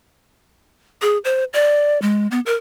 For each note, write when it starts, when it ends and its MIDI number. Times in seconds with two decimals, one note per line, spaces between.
1.02 1.18 68
1.25 1.44 72
1.53 2.00 74
2.02 2.27 56
2.31 2.40 59
2.46 2.55 70